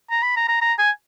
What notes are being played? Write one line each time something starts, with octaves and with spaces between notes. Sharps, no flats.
A#5
B5
A#5
A#5
A#5
G#5